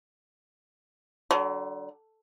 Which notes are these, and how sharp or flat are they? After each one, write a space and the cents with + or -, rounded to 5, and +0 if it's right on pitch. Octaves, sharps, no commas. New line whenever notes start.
D3 +0 F#3 +40